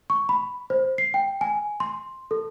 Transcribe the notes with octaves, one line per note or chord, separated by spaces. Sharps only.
C#6
B5
C5
C7
G5
G#5
C6
A4